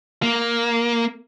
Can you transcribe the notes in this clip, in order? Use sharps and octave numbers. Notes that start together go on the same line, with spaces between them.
A#3